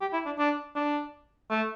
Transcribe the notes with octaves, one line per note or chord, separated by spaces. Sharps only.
G4
E4
D4
D4
D4
A3